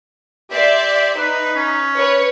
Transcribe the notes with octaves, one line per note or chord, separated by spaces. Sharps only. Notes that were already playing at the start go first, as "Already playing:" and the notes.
G4 D5 E5 C6
D#4 B4
C#4
B4 C#5